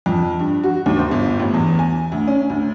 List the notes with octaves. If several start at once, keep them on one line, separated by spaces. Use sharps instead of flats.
F2
G2
F#4
D#2
C5
G1
A1
E2
G#5
D2
C#4
D2